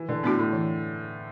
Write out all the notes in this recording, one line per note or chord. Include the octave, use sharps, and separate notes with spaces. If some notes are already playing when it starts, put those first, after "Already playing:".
Already playing: E3
D3
A2 B3 D4 F#4
A2
E3